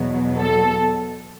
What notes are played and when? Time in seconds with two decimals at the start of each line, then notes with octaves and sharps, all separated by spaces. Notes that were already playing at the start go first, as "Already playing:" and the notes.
Already playing: E2 B2 F#3
0.40 A4